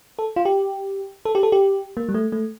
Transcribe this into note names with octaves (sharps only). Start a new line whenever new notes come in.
A4
F4
G4
A4
G4
A4
G4
A#3
G3
A3
A3